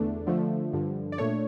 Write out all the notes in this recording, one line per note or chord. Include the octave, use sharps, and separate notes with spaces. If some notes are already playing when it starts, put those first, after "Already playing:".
Already playing: E2 D3 A3 D4
D3 F3 A3
G2 D3 F3
D5
A#2 A3 D4 C#5